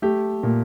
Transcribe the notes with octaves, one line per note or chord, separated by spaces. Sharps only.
A3 G4
A#2